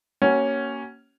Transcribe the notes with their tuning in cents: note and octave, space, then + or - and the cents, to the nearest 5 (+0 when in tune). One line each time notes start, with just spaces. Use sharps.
A#3 +0 C#4 +0 F#4 +35